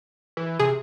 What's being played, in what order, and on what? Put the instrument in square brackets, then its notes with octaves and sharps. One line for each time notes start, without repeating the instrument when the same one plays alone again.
[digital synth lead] E3
[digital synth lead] C3 [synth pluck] G#4